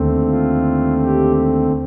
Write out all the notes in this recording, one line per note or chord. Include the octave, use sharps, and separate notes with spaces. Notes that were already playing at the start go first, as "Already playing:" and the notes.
Already playing: D#2 D3 A3 C4
F4
G4